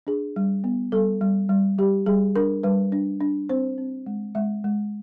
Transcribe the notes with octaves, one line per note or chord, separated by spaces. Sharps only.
D4 G#4
G3
B3
G3 A4
G3
G3
G3 G4
G3 G#4
D4 A#4
G3 B4
D4
D4
C4 C5
C4
G#3
G#3 E5
G#3